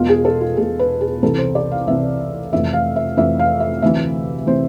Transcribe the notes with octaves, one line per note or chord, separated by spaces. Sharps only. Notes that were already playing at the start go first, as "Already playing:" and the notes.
Already playing: E1 E2 B2 F4
G#4
A4
F4
E1 E2 B2 G#4
B4
G#4
C2 C3 E3 A4
C5
D5
F5
C2 C3 E3 E5
F1 F2 E3 E5
F5
E5
F1 F2 E3 E5
F5
E5
D2 C3 E3 E5
C3 E3 C5